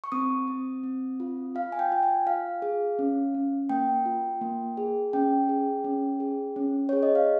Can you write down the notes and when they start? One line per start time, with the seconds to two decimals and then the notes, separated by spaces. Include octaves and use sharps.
0.04 C#6
0.12 C4 D#6
0.48 C4
0.83 C4
1.20 F4
1.55 F4 F5
1.72 G#5
1.79 G5
1.91 F4 G5
2.03 G#5
2.26 F4 F5
2.62 G#4
2.99 C#4
3.34 C#4
3.69 A#3 G5
4.06 F4
4.41 A#3
4.77 G#4
5.13 C#4 G5
5.49 G#4
5.84 C#4
6.20 G#4
6.56 C#4
6.89 G#4 C#5
7.03 D#5
7.15 F5